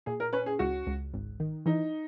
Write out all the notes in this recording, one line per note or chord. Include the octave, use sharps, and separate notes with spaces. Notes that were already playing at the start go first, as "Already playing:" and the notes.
A#2 G#4
A#4
C#4 B4
G#4
C#2 F#4
C#2
G#1
D#3
E3 D#4